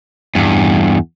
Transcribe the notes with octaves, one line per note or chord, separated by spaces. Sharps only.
E2 G2